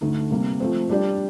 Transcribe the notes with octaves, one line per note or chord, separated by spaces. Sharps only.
D2 D3 A3 D#4
C3 G3 A#3
F3 A3 C4
G3 D4 G4 D5